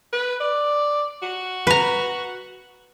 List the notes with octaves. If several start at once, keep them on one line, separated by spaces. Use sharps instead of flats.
B4
D5
F#4
B4 A#5